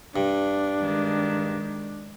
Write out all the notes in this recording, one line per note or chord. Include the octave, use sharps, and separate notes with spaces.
G2 D4
D#3 G#3